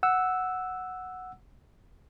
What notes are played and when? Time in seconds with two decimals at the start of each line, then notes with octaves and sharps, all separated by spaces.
0.03 F#5 E6